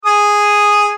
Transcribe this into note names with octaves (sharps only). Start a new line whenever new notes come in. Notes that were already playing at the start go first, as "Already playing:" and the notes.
G#4 D#6